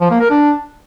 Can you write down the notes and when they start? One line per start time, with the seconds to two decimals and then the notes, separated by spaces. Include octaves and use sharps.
0.01 F3
0.11 A#3
0.21 A#4
0.30 D4